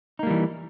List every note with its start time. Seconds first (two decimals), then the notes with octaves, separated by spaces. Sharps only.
0.19 D#4
0.23 A#3
0.27 G3
0.30 E3